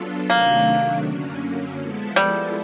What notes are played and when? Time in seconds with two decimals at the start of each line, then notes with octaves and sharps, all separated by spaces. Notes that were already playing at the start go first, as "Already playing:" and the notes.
Already playing: F#3 B3 D4 F4 A4
0.29 C3 D#3 F#3 A3 A#3 D4
1.04 F#2 D3 F#3 A#3 C#4
1.78 F3 G#3 B3 E4 A4
2.16 G3